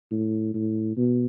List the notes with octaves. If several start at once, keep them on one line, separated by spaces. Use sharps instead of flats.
A2
A2
B2